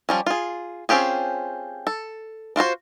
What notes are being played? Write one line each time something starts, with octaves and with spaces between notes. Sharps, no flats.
F3 G3 C#4
F4 G#4
C4 C#4 F4 G4 G#4
A4
D4 F4 F#4 C5